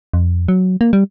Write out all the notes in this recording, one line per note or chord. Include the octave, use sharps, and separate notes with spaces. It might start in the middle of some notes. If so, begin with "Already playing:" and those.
F2
F#3
A#3
G3